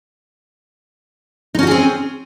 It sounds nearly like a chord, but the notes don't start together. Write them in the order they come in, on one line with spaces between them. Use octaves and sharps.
D#4 C#4 F#4 G#4 C4